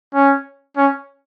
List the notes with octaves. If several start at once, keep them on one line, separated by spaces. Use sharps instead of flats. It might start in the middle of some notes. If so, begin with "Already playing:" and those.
C#4
C#4